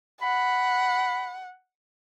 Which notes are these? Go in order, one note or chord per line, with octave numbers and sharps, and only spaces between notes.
F#5 B5